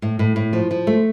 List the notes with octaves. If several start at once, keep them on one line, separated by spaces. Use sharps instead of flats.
A2
A2
A2
F3
F3
A3